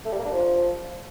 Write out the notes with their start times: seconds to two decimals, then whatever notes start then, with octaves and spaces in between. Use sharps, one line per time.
0.05 A3
0.12 G3
0.19 A#3
0.25 D4
0.32 F3